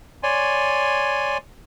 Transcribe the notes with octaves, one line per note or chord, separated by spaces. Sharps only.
C#5 D5 G#5 C6